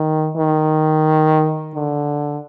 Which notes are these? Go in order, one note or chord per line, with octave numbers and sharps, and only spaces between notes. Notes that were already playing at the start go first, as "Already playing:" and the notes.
Already playing: D#3
D#3
D3